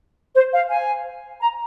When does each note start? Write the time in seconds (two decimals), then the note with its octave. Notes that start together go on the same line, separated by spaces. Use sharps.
0.35 C5
0.53 F5
0.70 G#5
1.41 A#5